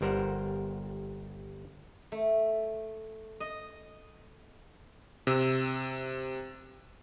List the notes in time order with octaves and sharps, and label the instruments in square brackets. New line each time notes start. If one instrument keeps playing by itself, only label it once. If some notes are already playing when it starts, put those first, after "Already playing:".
[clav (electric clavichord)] G1 G3 A#4 C5 F#5
[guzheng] A3
D#5
[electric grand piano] C3 E6